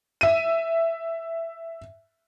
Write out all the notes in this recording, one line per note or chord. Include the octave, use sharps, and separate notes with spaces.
E5 D#7